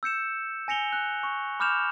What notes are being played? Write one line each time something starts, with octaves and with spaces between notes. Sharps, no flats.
E6 G6 C#7 E7
G#5 A#6 C#7 F7 G7
F#6
C#6
B5 D6 F6 G6 E7 F7